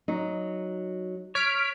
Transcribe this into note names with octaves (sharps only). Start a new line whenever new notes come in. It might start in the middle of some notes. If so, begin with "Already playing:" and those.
F#3 D#4
C#5 F6 B6 D7